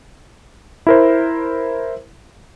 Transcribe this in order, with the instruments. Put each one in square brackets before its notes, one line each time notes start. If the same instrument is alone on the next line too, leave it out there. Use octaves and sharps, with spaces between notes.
[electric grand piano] E4 A#4 C5